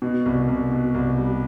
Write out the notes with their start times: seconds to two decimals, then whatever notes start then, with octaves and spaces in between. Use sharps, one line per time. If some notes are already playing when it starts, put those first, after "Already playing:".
0.02 B2
0.26 C2
0.48 C2
0.72 B2
0.94 C2
1.18 G3